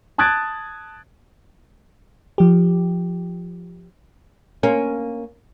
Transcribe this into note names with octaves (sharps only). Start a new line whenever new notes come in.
A5 D#6 F#6 G#6 A6 D7
F3 G4
A#3 C#4